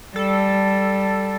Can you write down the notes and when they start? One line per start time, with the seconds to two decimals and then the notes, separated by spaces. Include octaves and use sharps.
0.16 G3 A4